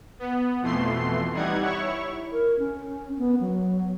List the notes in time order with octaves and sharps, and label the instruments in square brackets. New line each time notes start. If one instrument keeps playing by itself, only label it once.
[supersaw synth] B3
F2 B2 E3 A3 C6 C7
E3 G3 D#4 F#5 G#6
E4 C#5 C#6
[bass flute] A#4
C#4
B3
F#3